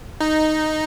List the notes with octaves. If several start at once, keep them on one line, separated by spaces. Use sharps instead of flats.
D#4